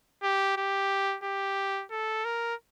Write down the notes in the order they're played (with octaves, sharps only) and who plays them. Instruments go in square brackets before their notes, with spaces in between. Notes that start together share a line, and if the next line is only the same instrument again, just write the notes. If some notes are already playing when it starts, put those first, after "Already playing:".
[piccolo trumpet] G4
G4
G4
A4
A#4